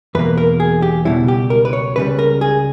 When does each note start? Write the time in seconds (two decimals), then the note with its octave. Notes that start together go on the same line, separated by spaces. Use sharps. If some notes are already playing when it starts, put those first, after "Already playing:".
0.15 E2 B2 A#3 B4
0.37 A#4
0.60 G#4
0.82 G4
1.05 C#2 B2 G3 E4
1.28 G4
1.50 A#4
1.65 B4
1.73 C#5
1.96 C#2 C#3 G3 B4
2.19 A#4
2.41 G#4